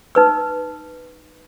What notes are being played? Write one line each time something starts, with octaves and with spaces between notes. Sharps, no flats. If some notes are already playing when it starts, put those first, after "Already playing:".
D#4 B4 E6